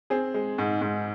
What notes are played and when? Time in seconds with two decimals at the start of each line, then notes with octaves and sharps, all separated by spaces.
0.10 C4 G#4
0.34 G#3
0.58 G#2
0.81 G#2